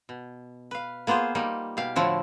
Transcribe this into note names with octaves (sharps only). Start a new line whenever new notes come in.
B2
B4 F5
A#3 B3 F4 G#4 C5
G3 A#3 D#4
B2 G4 F5
A2 D3 F3 E4 F#4